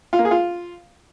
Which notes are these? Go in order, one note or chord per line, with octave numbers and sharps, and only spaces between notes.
F4
A#3
G#4
F4